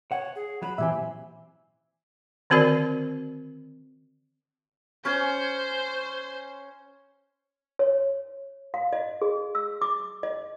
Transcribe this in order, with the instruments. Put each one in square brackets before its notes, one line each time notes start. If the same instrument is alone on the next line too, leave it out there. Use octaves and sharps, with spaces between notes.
[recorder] C#5 [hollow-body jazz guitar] F#5
[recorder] G#4
[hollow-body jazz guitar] F#3 [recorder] B5
[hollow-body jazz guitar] A#2 E3 C4 [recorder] G4 [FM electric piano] E5 G#5
[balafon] D3 D#3 C4 F#4 A#4 D5
[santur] C#4 C#5 G#5 [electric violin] C5
[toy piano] C#5
F5
D#5
G#4
E6
D6
D#5